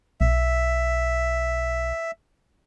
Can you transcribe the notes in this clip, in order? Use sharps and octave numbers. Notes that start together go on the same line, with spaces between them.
B1 E5